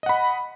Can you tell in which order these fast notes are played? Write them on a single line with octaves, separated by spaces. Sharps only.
D#5 F#5 B5